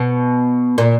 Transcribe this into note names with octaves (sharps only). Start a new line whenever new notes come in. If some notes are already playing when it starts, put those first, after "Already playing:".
Already playing: B2
A#2